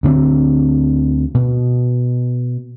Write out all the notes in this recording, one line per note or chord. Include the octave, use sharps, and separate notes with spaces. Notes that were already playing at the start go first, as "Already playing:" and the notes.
D2 D3 A#3 C4
B2